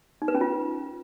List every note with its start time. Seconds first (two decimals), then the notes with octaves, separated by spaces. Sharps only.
0.22 D#4
0.28 B4
0.35 C#4
0.41 F4